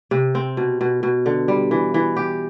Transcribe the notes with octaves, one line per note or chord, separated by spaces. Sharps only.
C3
C4
B2
B2
B2
D3
G3
E3
E3
G4